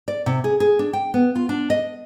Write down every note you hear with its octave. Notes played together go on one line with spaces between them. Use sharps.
D5
C3
G#4
G#4
D4
G5
B3
F4
D4
D#5